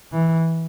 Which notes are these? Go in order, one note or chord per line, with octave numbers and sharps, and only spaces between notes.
E3